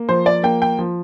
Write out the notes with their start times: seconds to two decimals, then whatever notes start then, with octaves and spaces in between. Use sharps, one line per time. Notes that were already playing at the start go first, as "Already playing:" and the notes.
Already playing: A#3
0.09 F3 C5
0.26 D5
0.43 A#3 G5
0.62 G5
0.79 F3